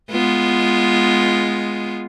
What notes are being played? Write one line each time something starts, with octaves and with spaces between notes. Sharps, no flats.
G#3 B3 F4